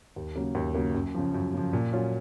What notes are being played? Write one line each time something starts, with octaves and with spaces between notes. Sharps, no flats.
D#2
C#3 F#3 A#3
D#2
C#3 F#3 A#3
F#2
C#3 F3
F#2
C#3 F3
A#2
F#3 C#4 F4